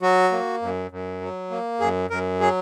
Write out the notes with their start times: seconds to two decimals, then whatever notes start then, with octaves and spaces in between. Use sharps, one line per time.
0.02 F#3 F#4
0.32 A#3
0.62 F#2
0.91 F#2
1.21 F#3
1.51 A#3
1.80 F#2 G#4
2.10 F#2 A#4
2.40 F#3 G#4